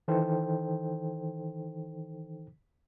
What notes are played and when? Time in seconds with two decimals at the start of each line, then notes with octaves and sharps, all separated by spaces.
0.08 D#3 E3 D#4 A4 C5 G5